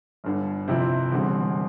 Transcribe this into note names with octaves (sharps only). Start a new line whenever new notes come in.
G1 G2 D3
F2 C3 F3 C4 E4
E1 E2 D3 G3 C4